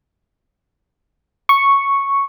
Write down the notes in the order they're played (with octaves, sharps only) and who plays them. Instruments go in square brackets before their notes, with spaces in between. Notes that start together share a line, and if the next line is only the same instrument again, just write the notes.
[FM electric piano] C#6